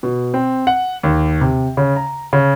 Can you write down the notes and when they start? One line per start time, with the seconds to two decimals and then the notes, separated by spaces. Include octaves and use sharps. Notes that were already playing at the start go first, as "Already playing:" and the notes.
0.03 B2
0.34 C4
0.67 F#5
1.03 D#2
1.41 C3
1.77 C#3
1.96 A#5
2.33 C#3